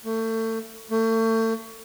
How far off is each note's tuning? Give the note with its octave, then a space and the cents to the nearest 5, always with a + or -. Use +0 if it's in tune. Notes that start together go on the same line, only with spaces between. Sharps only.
A3 +30
A3 +35